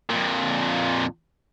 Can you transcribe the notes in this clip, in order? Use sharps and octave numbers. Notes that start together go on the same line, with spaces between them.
F2 A#2